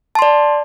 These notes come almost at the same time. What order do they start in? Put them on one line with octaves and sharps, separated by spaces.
A5 C6 D5